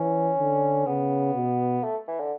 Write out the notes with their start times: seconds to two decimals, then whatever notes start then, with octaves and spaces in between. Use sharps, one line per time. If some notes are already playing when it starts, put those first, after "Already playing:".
Already playing: E3 C#4
0.38 D3
0.86 C#3 B3
1.35 B2
1.84 A3
2.08 E3
2.20 D3